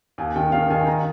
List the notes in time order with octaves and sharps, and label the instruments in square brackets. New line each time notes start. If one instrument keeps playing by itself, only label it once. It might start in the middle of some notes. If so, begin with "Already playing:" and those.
[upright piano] D#2 G#5
D#3 G5
D#3 F5
D#3 G#5
D#3 A#5